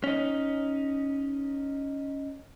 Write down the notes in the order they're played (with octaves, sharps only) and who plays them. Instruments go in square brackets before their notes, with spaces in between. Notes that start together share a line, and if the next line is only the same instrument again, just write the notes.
[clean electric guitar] C#4 D#4